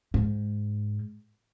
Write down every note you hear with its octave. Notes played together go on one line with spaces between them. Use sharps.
G#2